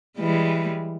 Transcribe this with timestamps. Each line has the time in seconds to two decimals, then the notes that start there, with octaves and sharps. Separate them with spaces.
0.18 E3 G3 G#3